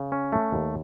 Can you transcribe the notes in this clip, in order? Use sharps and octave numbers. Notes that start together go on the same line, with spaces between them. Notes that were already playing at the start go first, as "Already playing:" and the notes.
Already playing: C#3
C#4
A3
D#2